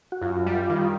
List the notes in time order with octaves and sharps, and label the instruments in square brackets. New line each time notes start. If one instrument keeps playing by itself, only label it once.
[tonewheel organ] F#4
[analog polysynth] F#2 [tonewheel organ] F4
[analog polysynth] G3
D#3